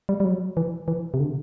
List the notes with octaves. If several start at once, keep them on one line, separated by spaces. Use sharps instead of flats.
G3
G3
F#3
E3
E3
C3
D3